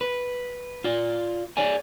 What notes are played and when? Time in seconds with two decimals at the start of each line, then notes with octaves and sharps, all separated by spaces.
0.01 B4
0.84 F4 D5
1.57 G#4 C#5 D5 G#5